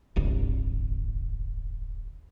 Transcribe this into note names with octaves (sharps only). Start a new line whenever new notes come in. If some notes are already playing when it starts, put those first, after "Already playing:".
D1 G1 C2